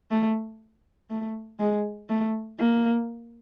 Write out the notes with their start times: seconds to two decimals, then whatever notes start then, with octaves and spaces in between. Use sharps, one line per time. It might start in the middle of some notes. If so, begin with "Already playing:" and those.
0.11 A3
1.10 A3
1.59 G#3
2.09 A3
2.59 A#3